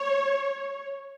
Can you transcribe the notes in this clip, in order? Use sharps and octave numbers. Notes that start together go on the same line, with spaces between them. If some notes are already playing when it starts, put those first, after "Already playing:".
Already playing: C#5